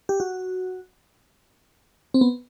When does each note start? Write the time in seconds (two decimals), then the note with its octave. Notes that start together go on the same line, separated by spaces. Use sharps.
0.09 G4
0.20 F#4
2.14 C4
2.21 B3